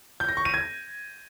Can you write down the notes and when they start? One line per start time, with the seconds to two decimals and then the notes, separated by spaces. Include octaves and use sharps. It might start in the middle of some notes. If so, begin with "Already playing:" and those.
0.20 G6
0.29 A#6
0.37 C#6
0.45 D#7
0.54 G#6